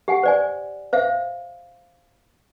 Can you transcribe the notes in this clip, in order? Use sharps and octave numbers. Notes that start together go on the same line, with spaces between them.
G4 F#5 G#5
C5 D5 G#5
C5 E5 F5